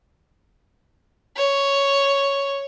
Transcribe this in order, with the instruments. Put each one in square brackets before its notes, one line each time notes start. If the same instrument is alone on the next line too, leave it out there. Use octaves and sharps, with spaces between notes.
[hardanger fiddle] C#5